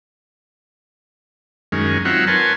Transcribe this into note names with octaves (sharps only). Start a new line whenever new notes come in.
F#2 D#3 G#3 C#4
F#3 C4 D#4 F4 E5 F#5
A#4 B4 C#5 G#5 A5 C6